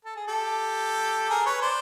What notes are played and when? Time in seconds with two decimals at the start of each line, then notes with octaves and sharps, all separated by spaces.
0.05 A4
0.16 G#4
0.27 G4 A4
1.30 G#4 A#4
1.46 B4 C#5
1.62 C5 D5